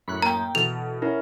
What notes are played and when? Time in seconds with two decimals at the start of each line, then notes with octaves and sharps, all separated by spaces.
0.08 F#2 A2 B5 C#6 F#6
0.22 A#3 G5 A#5
0.55 B2 E3 A4 F7
1.02 C#4 E4 A#4